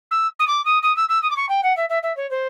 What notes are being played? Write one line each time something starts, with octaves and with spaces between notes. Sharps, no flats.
E6
D#6
D6
D#6
D#6
E6
E6
D#6
D6
C#6
G5
F#5
E5
E5
E5
C#5
C5